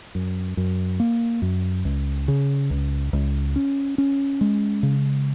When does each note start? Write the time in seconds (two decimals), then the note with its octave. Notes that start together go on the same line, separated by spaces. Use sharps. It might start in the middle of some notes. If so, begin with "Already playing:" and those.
0.15 F#2
0.57 F#2
1.00 A#3
1.42 F#2
1.85 C#2
2.28 C#3
2.70 C#2
3.13 C#2
3.56 C#4
3.98 C#4
4.41 G#3
4.83 C#3